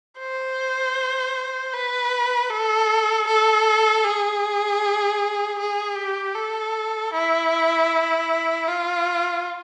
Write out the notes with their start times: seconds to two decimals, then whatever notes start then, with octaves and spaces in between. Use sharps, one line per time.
0.19 C5
1.73 B4
2.50 A4
3.27 A4
4.04 G#4
5.59 G#4
5.97 G4
6.35 A4
7.13 E4
8.67 F4